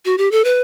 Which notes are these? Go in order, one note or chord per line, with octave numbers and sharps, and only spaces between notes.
F#4
G4
A4
B4